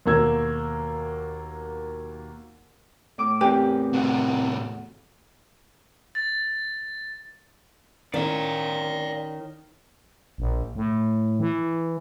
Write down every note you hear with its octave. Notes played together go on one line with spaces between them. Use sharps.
D#2 B2 A#3 E6 G#6
A2 D6 E6
E2 C4 G4 A#4 B4
A2 C3 F#4 F#5
A6
D#3 C#4 D5 F5
A#1
A2
E3